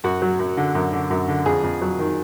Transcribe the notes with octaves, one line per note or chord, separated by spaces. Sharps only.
F#2 F#4
F#3
F#2
D3
F#2
D3
F#2
D3
F2 G#4
F2
F#3
D#3